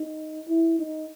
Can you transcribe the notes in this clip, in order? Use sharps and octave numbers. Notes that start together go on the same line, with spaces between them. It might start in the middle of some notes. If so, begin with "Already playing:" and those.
Already playing: D#4
E4
D#4